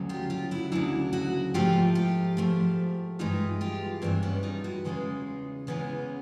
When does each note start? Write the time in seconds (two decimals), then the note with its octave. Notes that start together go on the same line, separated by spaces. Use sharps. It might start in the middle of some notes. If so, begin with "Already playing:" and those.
Already playing: D2 C#3 F#3
0.09 F4 G4
0.30 F4 G4
0.51 E4 F#4
0.72 D2 C#3 F#3 D4 E4
1.13 E4 F#4
1.54 G#2 F3 A3 F4 G4
1.95 F4 G4
2.37 G#2 F3 A3
3.19 G2 E3 G#3 D#4 F4
3.61 F4 G4
4.02 G2 E3 G#3 C4 D4
4.23 B3 C#4
4.43 D#4 F4
4.64 E4 F#4
4.84 E2 C#3 E3 G#3 D#4 F4
5.67 E2 C#3 E3 G#3 B3 C#4